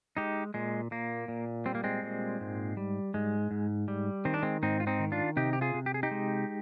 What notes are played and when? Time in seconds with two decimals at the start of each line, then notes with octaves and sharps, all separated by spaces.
0.17 G#3 D#4 G4
0.54 A#2 G#3
0.91 A#2 A#3
1.28 A#2
1.66 G3 C4
1.75 A#3
1.84 G#3 C4
2.03 A#2
2.40 G#2
2.77 G3
3.14 G#2 G#3
3.51 G#2
3.88 G3
4.25 D#3 C4
4.34 D4
4.43 G#3 C4
4.63 G#2 C4 D#4
4.80 F4
4.87 C4 D#4
4.99 D#3
5.12 D4 F4
5.36 C3 D#4 G4
5.53 G4
5.61 F4 G#4
5.74 C3
5.86 G4
5.94 G#4
6.03 D#4 G4
6.11 G#3